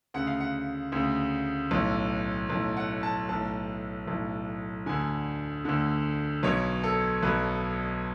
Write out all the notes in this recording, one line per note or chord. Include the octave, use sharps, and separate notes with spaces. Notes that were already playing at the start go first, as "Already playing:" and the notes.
D2 C#3 F#5
F5
F#5
D2 C#3
B1 A2
B1 A2
F#5
A5
B1 A2 A5
B1 A2
D2 D3 G#5
D2 D3
B1 B2 C#5
A4
B1 B2 B4